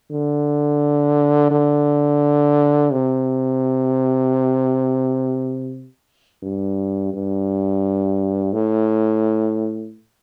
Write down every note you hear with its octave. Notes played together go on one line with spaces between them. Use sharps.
D3
D3
C3
G2
G2
A2